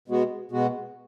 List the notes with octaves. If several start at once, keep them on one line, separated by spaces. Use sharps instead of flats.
B2 G#3 B3 F#4
B2 G#3 B3 F#4